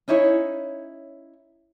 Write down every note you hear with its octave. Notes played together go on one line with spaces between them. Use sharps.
C#4 D#4 E4 C#5